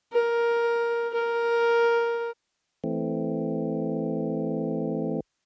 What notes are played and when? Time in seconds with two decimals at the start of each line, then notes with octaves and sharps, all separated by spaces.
0.13 A#4
1.13 A#4
2.84 E3 A3 C4